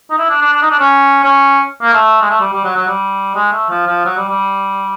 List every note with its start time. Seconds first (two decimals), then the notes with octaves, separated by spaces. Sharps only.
0.11 D#4
0.18 E4
0.30 D4
0.42 D4
0.53 D4
0.62 D#4
0.71 D4
0.79 C#4
1.24 C#4
1.82 A#3
1.94 A3
2.22 G#3
2.30 A3
2.41 G3
2.53 G3
2.64 F#3
2.76 F#3
2.88 G3
3.35 G#3
3.52 A3
3.69 F3
3.87 F3
4.05 F#3
4.17 G3
4.28 G3